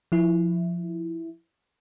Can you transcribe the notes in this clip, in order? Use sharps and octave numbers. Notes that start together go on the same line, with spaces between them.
F3 E4